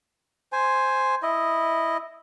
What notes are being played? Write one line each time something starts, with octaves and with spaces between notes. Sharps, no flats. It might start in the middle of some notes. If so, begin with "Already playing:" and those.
C5 G#5
E4 D#5